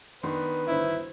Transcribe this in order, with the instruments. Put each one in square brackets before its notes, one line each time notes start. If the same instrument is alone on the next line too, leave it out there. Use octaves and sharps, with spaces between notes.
[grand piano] D#3 B3 D4 [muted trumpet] B4 [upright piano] C6
[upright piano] G1 D2 C5 [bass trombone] E4